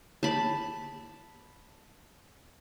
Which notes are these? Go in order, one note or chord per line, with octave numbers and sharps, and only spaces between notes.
A5 B5